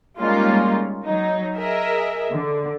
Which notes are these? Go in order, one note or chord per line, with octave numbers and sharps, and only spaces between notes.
G3 G#3 A#3 C#4 D#4 F4
F#3 D#4
G#4 A#4 D#5 E5
D3